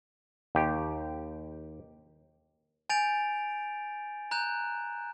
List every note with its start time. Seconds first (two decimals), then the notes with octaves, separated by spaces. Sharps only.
0.55 D#2 G4
2.90 G#5 G6 A6 D7 F7
4.31 A#5 F#6 G6 E7